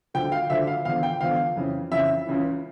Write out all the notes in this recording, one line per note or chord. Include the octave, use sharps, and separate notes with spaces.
D2 D3 F3 G5
F5
D2 D3 F3 E5
F5
E2 D3 F3 F5
G5
E2 D3 F3 F5
F2 C#3 E3
F2 C#3 E3 E5
C#2 C#3 E3